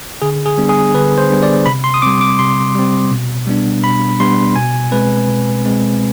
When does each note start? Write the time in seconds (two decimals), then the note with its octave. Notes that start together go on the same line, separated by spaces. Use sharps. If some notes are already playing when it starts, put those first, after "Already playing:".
0.22 D3 G#4
0.46 G#4
0.58 G3 B3 D4
0.69 G#4
0.94 D3 B4
1.18 C5
1.30 G3 B3 D4
1.43 D5
1.66 C3 B5
1.84 C6
1.94 D#6
2.02 G3 C4 D6
2.21 D6
2.39 C3 C6
2.75 G3 C4
3.11 B2
3.47 G3 B3 D4
3.83 B2 B5
4.20 G3 B3 D4 C6
4.56 B2 G#5
4.91 G#3 C4 B4
5.29 B2
5.65 G#3 C4